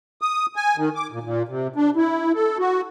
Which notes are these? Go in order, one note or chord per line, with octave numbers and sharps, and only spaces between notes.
D#6
G#5
D#3
D6
A#2
A#2
C3
D4
E4
A4
F#4